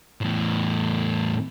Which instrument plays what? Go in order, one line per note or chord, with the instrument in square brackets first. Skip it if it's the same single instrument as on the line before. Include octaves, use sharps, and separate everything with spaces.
[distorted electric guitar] E2 A2